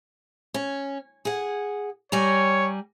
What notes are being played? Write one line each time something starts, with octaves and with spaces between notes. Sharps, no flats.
C#4
G#4 F#5
G3 C#5 G#5 A#5